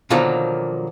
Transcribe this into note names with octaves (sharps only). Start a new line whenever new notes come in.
B2 D3 D#3 F3 F#3 A#3